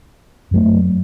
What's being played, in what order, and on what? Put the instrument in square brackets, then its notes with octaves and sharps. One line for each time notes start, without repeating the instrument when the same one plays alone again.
[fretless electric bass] F#2 F#3 A3